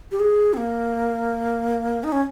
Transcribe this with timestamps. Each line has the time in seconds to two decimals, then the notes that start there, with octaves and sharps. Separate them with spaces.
0.12 G4
0.20 G#4
0.54 C4
0.57 A#3
2.04 D#4
2.12 C#4